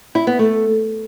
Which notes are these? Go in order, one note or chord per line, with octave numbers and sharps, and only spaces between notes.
E4
B3
A3